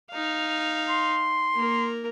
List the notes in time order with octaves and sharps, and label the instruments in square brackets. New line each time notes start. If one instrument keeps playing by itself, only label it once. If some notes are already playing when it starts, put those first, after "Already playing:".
[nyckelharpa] D#4 F5
[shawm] C6
[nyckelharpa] A#3 A#4